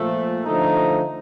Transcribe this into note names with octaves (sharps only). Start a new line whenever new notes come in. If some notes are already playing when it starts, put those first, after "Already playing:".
Already playing: A#2 F3 A3
D3 F3 A3 D#4